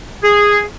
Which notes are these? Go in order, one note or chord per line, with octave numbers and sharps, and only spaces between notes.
G#4